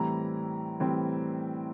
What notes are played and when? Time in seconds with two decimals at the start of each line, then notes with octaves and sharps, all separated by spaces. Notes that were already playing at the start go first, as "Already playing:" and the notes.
Already playing: A2 E3 G3 C4 A#5
0.79 A2 E3 G3 C4